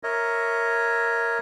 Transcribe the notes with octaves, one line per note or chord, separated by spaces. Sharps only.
A#4 C#5 D#5 E5